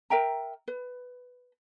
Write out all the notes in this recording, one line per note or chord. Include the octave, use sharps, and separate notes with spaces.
A#4 E5 G5 A#5
B4